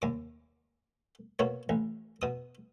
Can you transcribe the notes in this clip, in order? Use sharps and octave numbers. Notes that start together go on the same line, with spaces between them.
D#2 D6
B2 A#3 C#5
A1
B2 D#6